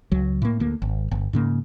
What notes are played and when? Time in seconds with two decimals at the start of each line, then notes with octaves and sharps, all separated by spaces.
0.12 C#2 F#3
0.42 A2 A#3
0.60 D2 A#3
0.82 G#1
1.11 G1
1.33 G#2 C#3 A#3